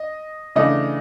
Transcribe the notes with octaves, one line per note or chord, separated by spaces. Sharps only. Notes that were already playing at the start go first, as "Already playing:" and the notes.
Already playing: D#5
C#3 E3 A3 D4 D#5